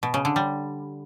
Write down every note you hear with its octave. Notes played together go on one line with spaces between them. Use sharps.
B2
C#3
D3
G3